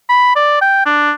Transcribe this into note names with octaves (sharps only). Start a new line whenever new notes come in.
B5
D5
G5
D4